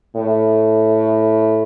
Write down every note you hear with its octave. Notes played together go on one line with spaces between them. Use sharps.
A2